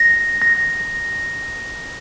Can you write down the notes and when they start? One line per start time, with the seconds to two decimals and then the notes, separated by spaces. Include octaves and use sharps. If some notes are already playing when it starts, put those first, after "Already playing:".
Already playing: A#6
0.42 A#6